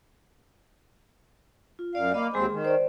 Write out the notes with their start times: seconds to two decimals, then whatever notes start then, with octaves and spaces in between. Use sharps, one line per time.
1.79 F4
1.95 F#2 D5 F5
2.14 A#3 D#5 F5 B5 D6
2.34 D#2 G#3 C4 G#4 C5 G#5
2.52 D#3
2.65 C5 D5